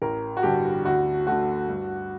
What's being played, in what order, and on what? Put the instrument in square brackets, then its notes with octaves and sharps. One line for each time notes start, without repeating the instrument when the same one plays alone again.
[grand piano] A1 A#4
F#4
G2 D3 G4
D2 F#4
D3 A3 F#4
G2